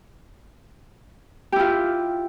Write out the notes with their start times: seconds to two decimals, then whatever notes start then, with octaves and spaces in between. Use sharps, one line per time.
1.52 G4
1.56 E4
1.60 F4